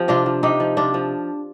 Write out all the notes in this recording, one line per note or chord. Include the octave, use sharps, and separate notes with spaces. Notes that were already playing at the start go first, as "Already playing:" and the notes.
Already playing: F3 C4 G4
C3 D4 F4
F3
C3 D#4 G4
F3
C3 D4 F4
F3